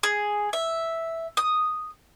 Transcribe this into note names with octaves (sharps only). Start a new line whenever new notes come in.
G#4
E5
D#6